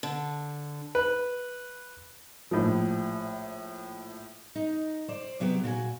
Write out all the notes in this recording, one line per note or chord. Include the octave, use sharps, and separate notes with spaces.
D3
B4
A#1 A2 F3
D#4
C5 D5
C3 F#3 B3 G4
A#2 F#4 A#4 G#5